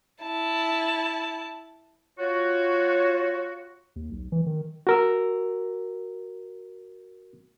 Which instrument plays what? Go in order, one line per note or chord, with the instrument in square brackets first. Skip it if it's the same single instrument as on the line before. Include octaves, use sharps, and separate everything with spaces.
[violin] E4 A5
[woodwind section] F4 F#4 [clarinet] C#5
[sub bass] D#2
B1
E3
D#3
[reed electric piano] F#4 A#4 E6